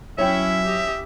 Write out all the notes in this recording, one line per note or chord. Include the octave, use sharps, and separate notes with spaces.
F#3 C#4 E4 C#5 E5 G5
G4 D#5